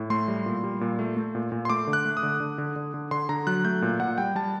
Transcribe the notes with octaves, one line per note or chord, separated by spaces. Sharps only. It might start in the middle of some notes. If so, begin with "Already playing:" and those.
Already playing: A2
A3 C6
G3
A#2
G3
A#2
A3
A3
A#2
A#2
C6
A3 D6
D3
F#6
A3
D#6
D3
D3
D3
D3
D3
D3 C6
D3 A#5
F#3 F#6
A3 G6
A#2
A#2 F#5
G3 G5
G3 A5